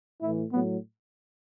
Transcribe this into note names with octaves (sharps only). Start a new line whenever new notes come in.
A2 E3 E4
A2 F#3 B3